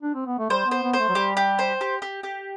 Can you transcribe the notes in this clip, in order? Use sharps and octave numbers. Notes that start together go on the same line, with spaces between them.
D4
C4
B3
A3
G3 C5
B3
C5
B3
C5
A3
F#3
G3 G4
G4
C5
G4
G4
G4